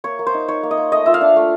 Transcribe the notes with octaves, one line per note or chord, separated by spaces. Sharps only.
A#3 C#5
A#3
C5
D#4
D#4 C#5
A#3
D#5
A#3
A3 D#5
F4 E5
F5
D4
A3